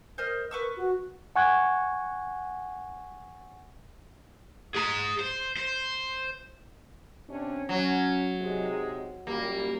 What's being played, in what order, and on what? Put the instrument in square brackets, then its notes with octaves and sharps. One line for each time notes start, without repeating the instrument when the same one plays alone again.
[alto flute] A#4 [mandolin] C5 D#5 F6
[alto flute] A#4 [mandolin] B4 C#6 E6
[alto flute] F#4
[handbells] F#5 G#5 C#6 F#6 G#6
[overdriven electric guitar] G#4 A#5
C5
C5
[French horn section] C3 C#4 D4
[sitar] F#3 [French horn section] C#4
[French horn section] G#2 C3 G#3
[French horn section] F#2 A#2 G3 [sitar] A#3